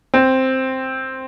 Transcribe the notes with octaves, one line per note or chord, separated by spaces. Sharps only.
C4